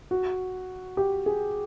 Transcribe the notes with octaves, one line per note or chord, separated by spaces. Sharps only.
F#4
G4
G#4